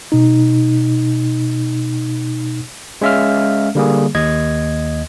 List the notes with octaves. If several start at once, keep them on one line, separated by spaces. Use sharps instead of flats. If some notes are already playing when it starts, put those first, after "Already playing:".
B2 D#4
G#3 C#4 E5 F5 F6
D3 G3 A#3 G#4
D#2 D#5 G#6